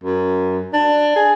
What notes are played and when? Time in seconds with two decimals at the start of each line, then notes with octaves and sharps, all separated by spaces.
0.04 F#2
0.73 D4
1.16 G#4